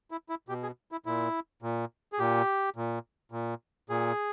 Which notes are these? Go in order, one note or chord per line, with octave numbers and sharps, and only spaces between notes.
E4
E4
B2 G4
G#4
E4
A#2 E4
A#2
G#4
A#2 G4
A#2
A#2
A#2 G#4